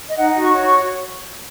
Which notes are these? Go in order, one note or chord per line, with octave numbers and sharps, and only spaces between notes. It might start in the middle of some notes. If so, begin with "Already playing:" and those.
D#5
D#4 F#5
F#4
C#6
C#5
C#6